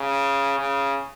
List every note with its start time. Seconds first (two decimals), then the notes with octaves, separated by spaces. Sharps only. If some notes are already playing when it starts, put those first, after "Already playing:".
Already playing: C#3
0.59 C#3